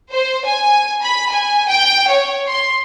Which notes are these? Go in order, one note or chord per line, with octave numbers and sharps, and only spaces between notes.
C5
G#5
B5
G#5
G5
C#5
C6